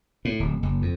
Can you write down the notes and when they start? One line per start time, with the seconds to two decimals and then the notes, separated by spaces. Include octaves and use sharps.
0.25 A2
0.40 D1
0.63 F#1
0.82 F2